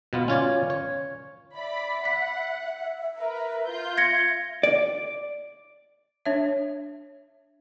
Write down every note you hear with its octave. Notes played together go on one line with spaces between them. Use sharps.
B2 B3 F4
C#4 F4 C#5 D5
C#5
D5 E5 B5
F#5 B6
A#4 B4
F4 G6
G#6 A#6 C#7
D5
D4 C#5 E5